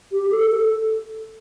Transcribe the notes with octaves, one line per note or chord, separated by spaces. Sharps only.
G4
A4
A4